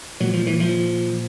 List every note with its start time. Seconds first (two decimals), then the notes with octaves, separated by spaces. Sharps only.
0.20 A#2 F#3
0.33 F3
0.47 E3
0.60 F3